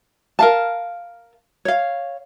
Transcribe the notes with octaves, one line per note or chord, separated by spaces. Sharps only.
A#4 F5 A5
C#5 F5